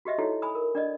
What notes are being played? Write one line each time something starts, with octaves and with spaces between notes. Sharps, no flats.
F#4 G4 D#5 E5
D#4 E4 F#4 G4 A4 C#5
G#5 B5 D#6
A#4
D4 D5 D#5